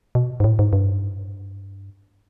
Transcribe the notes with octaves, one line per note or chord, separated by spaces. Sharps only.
B2
G#2
A2
G#2
G2